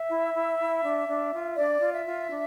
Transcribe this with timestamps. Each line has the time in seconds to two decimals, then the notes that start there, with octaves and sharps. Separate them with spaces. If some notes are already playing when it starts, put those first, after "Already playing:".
Already playing: E5
0.10 E4
0.35 E4
0.59 E4
0.84 D4
1.08 D4
1.32 F4
1.57 D4 D5
1.81 F4
1.93 E5
2.05 F4
2.30 D4